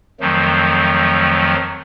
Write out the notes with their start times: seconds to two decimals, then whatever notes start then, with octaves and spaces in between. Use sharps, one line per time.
0.20 F2 D#3 F3 F#3 A3